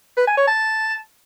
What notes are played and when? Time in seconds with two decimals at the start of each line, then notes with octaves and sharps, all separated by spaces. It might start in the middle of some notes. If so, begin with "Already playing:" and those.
0.17 B4
0.27 G#5
0.37 C#5
0.47 A5